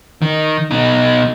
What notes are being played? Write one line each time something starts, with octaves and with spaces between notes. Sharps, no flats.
D#3
B2 D#4